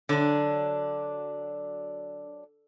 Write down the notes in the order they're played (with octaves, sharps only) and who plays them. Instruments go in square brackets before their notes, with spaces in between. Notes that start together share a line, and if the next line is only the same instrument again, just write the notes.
[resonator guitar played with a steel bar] D3 [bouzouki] F#3 D4